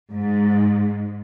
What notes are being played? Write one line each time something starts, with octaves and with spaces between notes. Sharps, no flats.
G#2